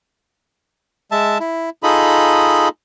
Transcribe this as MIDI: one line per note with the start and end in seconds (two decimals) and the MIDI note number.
1.12 1.38 56
1.12 1.38 76
1.12 1.38 81
1.40 1.70 64
1.83 2.69 63
1.83 2.69 65
1.83 2.69 68
1.83 2.69 69
1.83 2.69 75
1.83 2.69 83